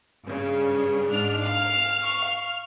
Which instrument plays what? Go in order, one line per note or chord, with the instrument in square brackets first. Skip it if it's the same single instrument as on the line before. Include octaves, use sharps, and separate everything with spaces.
[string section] G2 C#3
G#2 D4 F6
[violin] F5 [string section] F6
[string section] C#6 F6